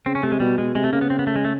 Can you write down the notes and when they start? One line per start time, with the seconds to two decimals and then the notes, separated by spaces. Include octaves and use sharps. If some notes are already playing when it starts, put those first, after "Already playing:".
0.06 C#3 C4
0.15 C#4
0.23 C3 A3
0.32 G#3
0.40 B2 G3
0.58 B2 G#3
0.75 C3 G#3
0.84 A3
0.92 C#3 A#3
1.01 B3
1.10 C4
1.19 B3
1.27 A3
1.36 G#3
1.45 A3